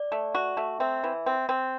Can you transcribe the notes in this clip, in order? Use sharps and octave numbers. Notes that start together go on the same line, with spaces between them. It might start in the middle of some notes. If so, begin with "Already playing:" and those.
Already playing: D5
A3
F#4
A3
C4 E5
E3
C4
C4